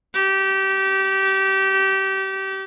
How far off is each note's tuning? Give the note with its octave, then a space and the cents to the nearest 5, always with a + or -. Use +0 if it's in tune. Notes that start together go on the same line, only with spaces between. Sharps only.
G4 -25